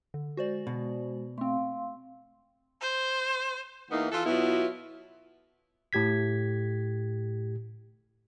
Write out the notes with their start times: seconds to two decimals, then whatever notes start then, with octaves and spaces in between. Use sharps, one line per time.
0.14 D3
0.37 G#3 F#4 C5 D5
0.67 B2
1.38 A3 C4 F5 C6
2.82 C5
3.90 E2 E3 A#3 B3 D#4
4.12 E3 F4 A4
4.26 B2 F#3 B3 E4 F4
5.93 A2 G4 G#6 B6